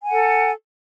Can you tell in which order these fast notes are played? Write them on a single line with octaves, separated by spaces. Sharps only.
G#5 F#5 A4